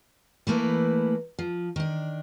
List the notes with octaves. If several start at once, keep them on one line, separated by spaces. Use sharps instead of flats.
E3 A3 A#3 E4 B4
F3
D#3 D4